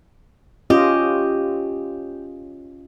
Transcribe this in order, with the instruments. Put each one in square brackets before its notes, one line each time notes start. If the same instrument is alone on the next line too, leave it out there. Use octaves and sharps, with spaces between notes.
[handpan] C#4 F4 D#5 [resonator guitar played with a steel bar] G4